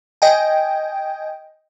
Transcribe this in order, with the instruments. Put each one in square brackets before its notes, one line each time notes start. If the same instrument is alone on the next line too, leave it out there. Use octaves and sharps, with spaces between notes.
[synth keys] D#5 G5 G#5